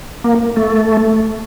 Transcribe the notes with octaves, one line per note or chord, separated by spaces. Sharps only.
A#3
A3